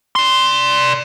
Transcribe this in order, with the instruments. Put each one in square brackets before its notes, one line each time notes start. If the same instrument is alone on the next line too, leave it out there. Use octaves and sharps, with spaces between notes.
[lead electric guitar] D5 C6